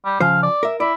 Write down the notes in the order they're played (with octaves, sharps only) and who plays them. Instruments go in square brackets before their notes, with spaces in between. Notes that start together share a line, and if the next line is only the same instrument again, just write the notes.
[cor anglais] G3
[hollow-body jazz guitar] C#3 F3 C5 [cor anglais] F5
[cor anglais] D5
[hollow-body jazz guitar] A#4 E5
[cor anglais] E4 [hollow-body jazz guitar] D5